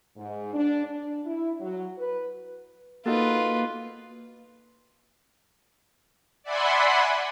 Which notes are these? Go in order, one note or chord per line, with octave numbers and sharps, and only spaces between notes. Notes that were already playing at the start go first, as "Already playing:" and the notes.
G#2
D4
D4
E4
F#3
B4
A#3 D#4 F4 F#4 A4 B4
D5 E5 F#5 G#5 B5 C6